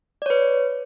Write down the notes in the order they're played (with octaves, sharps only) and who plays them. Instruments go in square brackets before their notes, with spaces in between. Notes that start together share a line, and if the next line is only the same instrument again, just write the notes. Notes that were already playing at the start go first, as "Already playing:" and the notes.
[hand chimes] D5
C#5
B4